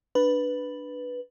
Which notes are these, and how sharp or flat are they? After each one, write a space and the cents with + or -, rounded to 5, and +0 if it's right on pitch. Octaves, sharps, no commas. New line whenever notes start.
D4 +0 B4 +0